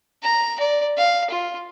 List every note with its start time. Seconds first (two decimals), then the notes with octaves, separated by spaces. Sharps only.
0.23 A#5
0.60 D5
0.98 F5
1.30 F4